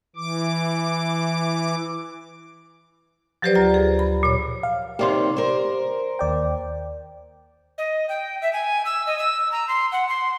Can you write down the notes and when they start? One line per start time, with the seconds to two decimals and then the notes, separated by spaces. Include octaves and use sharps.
0.16 E3 D6
3.42 F3 F#3 G4 B4 C5 D5
3.55 D2 F4 A#5
3.74 G#4
3.99 B5
4.23 A#2 C#5
4.63 F5
4.99 D#2 C3 A#3 G4 D5 C6
5.36 A#4 C5
6.19 D#2 D5 G5
7.78 D#5
8.09 G5
8.42 E5
8.53 G#5
8.85 E6
9.06 D#5
9.19 E6
9.52 A#5
9.68 C6
9.92 F#5
10.09 C6